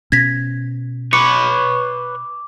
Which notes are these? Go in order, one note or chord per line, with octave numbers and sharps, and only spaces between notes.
B2 C#4 G#6 A#6 B6
B4 C#5 D6 C#7